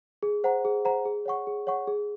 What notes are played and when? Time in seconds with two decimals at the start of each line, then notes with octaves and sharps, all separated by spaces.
0.23 G#4
0.44 C5 F#5 A#5
0.65 G#4
0.85 C5 F#5 A#5
1.05 G#4
1.26 C#5 F#5 C#6
1.47 G#4
1.67 C#5 F#5 C#6
1.87 G#4